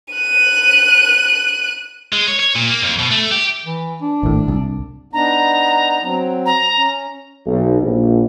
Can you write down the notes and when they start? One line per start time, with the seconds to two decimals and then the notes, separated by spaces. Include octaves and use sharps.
0.14 F#6 D#7
2.13 G#3
2.28 C#5
2.39 C#5
2.55 A#2
2.69 A#3
2.83 F2
2.99 B2
3.11 A3
3.31 G4
3.65 E3
4.02 D4
4.23 G#1 A2
4.48 C2
5.13 B3 D4 D#4 A#5
6.02 F#3 C4
6.46 A#5
6.76 C#4
7.47 B1
7.82 A#1